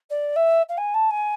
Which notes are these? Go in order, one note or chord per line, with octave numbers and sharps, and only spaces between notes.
D5
E5
F5
G#5
A5
G#5